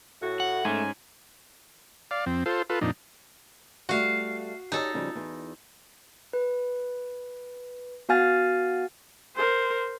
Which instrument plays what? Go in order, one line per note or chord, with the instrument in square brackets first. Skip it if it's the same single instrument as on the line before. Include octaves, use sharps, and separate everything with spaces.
[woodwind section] A2 [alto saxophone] F#4
[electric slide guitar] F#5
[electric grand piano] G#2 C#4 [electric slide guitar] A3 [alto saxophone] G#5
[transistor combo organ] D5 F5
F2 C4
F4 A4 C5
F4 A4 B4
F2 A#2 D4 D#4
[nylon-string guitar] G3 A3 [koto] F#4 F5
[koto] D#4 A4 [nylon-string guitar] G4 C#5 D#5
[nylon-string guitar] C#3 F3 G3
E2
[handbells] B4
B3 F#4 F5 G#5 F6 A6
[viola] A#4 C5